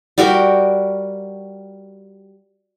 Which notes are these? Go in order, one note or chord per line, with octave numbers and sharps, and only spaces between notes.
G3 F#4 A#4 G5